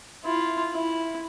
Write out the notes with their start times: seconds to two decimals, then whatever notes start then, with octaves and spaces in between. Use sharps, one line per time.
0.24 E4 F4
0.72 E4